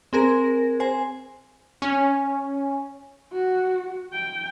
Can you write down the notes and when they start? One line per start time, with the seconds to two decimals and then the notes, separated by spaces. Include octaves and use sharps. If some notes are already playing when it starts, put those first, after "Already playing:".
0.13 C4 G#4 A#4 A#6
0.80 C5 G#5
1.82 C#4
3.33 F#4
4.13 G5